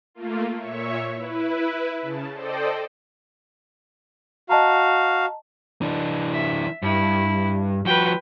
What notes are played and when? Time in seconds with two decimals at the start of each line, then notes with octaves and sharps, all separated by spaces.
0.14 A3 A#3 F4
0.58 A#2 C#5 E5 C#6
1.14 E4 B4
2.02 C#3 A5
2.33 A4 C5 D5 D#5 G5
4.49 F#4 D#5 F5 A5 A#5
5.82 E3 D4
6.32 E5
6.82 G2 E4
7.85 F3 F#4 B4 G5